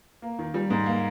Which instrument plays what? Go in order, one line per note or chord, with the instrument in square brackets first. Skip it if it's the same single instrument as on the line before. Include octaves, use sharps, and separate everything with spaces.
[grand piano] A#3
D#3
G3
G#2
A#3